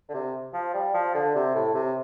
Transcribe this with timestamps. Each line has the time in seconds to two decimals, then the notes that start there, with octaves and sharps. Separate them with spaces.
0.09 D3
0.14 C3
0.54 F3
0.73 G3
0.94 F3
1.14 D3
1.35 C3
1.54 A2
1.74 C3